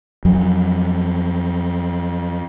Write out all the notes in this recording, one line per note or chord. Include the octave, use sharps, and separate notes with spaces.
F2 F#3